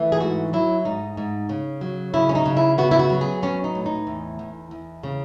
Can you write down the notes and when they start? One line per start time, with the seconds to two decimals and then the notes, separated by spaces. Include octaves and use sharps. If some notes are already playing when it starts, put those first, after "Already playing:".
Already playing: E3 A3
0.12 G#4
0.20 G#2 F#4
0.53 F#3 E4
0.85 G#2 D#4
1.17 G#2
1.49 C#3
1.81 F#3
2.14 C#3 E4
2.29 C#4
2.35 D#4
2.46 C#3
2.57 E4
2.78 B3 F#4
2.91 E4
2.99 F#4
3.10 F#3
3.21 G#4
3.43 B3 C#4
3.64 D#4
3.75 A2
3.86 D#4
4.07 E2
4.39 E2
4.71 E2
5.03 C#3